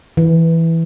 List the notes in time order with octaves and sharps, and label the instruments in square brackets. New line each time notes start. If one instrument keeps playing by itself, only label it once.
[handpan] E3